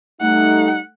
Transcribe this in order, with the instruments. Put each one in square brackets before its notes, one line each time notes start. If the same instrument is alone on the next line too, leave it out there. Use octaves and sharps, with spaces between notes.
[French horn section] G3 D#4 [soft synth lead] A3 [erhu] F#5